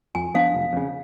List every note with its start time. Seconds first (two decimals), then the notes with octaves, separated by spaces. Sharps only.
0.15 F2 G#5
0.34 F3 B3 D4 F5
0.54 F1
0.73 F2 C#3